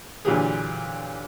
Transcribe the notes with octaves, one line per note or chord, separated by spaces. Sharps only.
A#2 D3 E3 F#3 G4 G#4